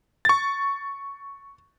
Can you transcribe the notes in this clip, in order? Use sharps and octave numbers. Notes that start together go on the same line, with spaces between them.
C#6 A6